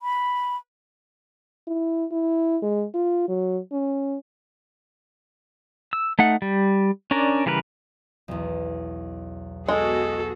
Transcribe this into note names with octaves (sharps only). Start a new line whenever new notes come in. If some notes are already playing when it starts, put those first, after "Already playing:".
B5
E4
E4
G#3
F4
F#3
C#4
E6
A3 D#4 F#5
G3
C#4 D4 A#4 D5
C#3 E3 G3 A#4 B4
B1 E2
G#3 B3 F#4 G#4 A4